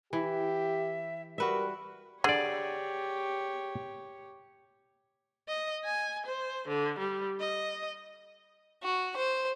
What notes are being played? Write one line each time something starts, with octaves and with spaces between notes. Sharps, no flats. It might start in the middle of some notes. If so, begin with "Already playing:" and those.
E3 G4 E5
G3 F#4 A#4 B4 E5
D3 G4 G#4 C#5 D5
D#5
G#5
C5
D3
G3
D#5
F#4
C5